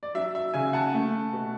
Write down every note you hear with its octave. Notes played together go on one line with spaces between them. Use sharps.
D5
F#3 E5
E5
C#3 E5 G#5
F#5 A5
A3
B2